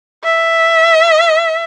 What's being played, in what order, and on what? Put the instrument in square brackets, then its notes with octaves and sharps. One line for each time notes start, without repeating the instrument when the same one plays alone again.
[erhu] E5